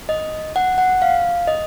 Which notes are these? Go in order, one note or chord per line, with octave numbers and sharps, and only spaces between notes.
D#5
F#5
F#5
F5
D#5